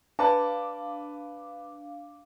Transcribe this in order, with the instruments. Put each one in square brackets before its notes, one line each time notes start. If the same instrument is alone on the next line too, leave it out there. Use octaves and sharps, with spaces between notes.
[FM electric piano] D4 F5 D6 [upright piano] B4 A5